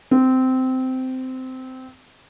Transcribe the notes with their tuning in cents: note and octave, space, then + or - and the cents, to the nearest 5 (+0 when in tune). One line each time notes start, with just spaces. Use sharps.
C4 -15